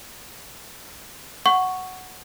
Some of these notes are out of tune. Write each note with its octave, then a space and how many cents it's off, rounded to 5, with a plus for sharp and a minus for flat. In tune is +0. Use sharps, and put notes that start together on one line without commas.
F#5 +0 C#6 +0